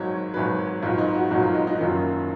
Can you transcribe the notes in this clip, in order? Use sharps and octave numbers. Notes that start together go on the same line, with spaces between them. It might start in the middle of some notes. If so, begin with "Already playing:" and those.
Already playing: G#1 G#2 F#3 C#5
G#1 G#2 F#3 B4
G#1 G#2 F#3 F4
D#4
F#4
G#1 G#2 F#3 F#4
F4
D#4
D#4
F#1 F#2 D#3 F#3 F4